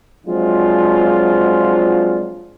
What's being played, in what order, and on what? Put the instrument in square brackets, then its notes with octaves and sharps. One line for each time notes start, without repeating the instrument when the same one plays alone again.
[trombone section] F3 F#3 G#3 C4 D4 F4